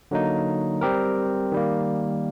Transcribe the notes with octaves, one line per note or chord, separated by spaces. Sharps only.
D3 F#3 A#3 D#4
G3 C4 G4 A#4
D#3 G3 A#3